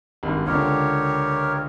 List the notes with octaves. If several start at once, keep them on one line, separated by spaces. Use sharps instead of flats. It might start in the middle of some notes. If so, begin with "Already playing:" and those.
G#1 G2
C#2 D3 G4 A#4 C#5